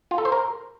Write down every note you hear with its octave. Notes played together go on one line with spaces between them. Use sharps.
F4
A4
C5
A#4